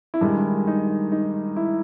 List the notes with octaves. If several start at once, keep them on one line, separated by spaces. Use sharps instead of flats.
E4
G2 D#3 G#3 D#4
D#4
D#4
E4